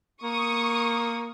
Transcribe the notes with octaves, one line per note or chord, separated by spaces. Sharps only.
A#3 C#6 D#6